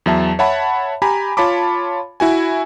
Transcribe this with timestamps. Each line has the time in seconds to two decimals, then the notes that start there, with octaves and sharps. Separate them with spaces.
0.06 E2 F#3 E5 A5
0.39 C#5 E5 F#5 A5 B5
1.02 G4 G#5 A#5 B5
1.37 F4 C#5 A5 B5 D6
2.20 E4 F#4 G#5